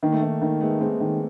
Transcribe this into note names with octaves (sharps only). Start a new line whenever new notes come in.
D#3 A#3
A3
D#3 A#3
D#3 A#3
G#3 A3 B3
G#3 A#3 C4
D#3